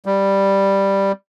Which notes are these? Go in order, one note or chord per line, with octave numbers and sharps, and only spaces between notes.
G3